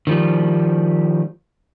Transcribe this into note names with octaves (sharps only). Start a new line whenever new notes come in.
D#3 F3 G3